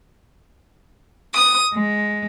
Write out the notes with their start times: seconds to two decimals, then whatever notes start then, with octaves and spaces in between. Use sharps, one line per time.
1.35 D#6
1.73 G#3